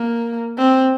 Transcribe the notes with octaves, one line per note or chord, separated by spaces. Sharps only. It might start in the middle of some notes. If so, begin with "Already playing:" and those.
Already playing: A#3
C4